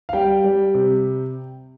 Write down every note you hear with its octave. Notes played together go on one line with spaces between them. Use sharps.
F5
G3 G5
G3
C3